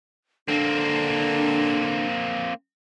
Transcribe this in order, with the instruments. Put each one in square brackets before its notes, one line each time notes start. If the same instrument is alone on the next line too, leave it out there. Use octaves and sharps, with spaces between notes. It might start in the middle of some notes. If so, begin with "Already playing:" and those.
[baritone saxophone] D3 [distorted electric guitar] A#3 C4 [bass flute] D4